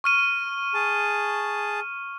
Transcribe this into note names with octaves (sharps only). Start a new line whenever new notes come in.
C#6 F6 D#7
G#4 A5